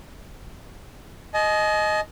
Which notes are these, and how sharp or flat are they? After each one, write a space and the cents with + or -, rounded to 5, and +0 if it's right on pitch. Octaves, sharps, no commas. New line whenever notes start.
D#5 +0 G#5 +45